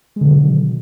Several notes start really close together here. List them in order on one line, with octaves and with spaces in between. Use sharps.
G#3 D3 B2 F#3 D#3